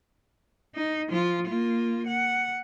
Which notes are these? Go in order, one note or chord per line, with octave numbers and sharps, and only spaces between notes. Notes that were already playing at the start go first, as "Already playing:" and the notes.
D#4
F3 F4
A#3 F4
F#5